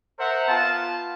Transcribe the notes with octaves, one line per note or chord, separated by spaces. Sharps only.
A#4 C5 E5 F#5
B3 F4 A5